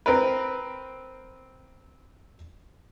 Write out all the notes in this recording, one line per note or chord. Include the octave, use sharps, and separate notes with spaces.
C4 A#4 B4